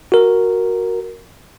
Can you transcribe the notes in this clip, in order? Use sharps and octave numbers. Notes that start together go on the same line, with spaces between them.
F#4 A#4